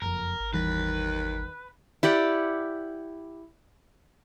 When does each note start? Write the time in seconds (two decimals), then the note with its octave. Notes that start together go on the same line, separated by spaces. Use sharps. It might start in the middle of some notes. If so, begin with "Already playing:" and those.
0.02 F#1 F2 A#4
0.40 G#1
0.53 E2 D#3 E3 G3 B4
2.03 E4 G4 D5 F#5